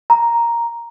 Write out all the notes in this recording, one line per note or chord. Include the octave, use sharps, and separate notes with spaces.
A#5